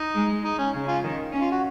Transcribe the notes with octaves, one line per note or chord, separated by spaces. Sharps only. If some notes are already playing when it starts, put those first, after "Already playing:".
Already playing: D#4
G#3
D#4
C#4
C#3
C#4 F4
D#3
C#4
F4
F#4